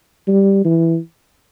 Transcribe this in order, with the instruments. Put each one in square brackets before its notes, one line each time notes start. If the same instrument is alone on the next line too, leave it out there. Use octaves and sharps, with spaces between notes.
[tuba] G3
E3